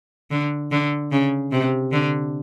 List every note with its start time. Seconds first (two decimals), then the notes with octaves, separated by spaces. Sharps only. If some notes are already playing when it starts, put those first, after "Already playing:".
0.31 D3
0.72 D3
1.12 C#3
1.52 C3
1.92 D3